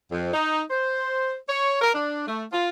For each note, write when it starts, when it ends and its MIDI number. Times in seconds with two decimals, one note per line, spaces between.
0.11 0.30 41
0.34 0.61 63
0.71 1.34 72
1.49 1.76 73
1.82 1.94 70
1.94 2.23 62
2.27 2.44 57
2.53 2.69 65